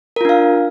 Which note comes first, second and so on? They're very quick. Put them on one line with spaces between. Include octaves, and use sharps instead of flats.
A#4 F4 D4 F5